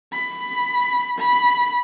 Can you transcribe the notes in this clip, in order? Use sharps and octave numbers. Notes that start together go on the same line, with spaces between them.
B5
B5